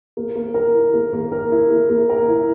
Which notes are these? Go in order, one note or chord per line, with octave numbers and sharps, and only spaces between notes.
A#3
A#3
A#4
E4
A#3
A#3
A#4
E4
A#3
A#3
A#4
E4